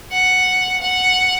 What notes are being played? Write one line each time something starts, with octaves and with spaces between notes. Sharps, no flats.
F#5
F#5